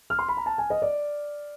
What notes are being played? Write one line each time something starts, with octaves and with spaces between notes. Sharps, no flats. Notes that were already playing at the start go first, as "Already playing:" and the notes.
F6
C6
B5
A#5
A5
G#5
D#5
D5